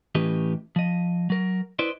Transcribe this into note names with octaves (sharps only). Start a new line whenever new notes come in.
A2 E3 C#4 G4 B4 D#5
F3 D#5
F#3 A#4
E4 B4 C5 D5 D#5